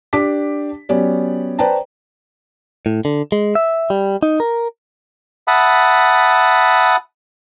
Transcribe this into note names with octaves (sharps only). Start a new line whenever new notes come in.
D4 G4 D6 B6
F#3 B3 C#4 G4 D5
B4 C5 D5 G5 A5 A#5
A2
D3
G#3
E5
G3
D#4
A#4
E5 F#5 A5 B5 D#6